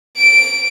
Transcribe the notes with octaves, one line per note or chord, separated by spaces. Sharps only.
D7